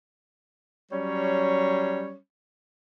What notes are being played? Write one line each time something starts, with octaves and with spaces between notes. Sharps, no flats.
F#3 G3 C#4 C#5